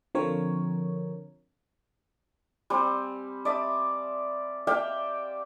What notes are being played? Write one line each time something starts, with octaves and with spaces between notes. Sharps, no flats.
D3 F3 C4 A#4 C#5
G3 C4 G#5
D5 E5 D#6
D5 E5 F5 G5